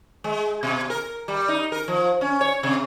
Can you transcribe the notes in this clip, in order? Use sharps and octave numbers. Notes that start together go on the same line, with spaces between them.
G#3
B2
A#4
G3
D#4
A#4
F3
C#4
C#5
C3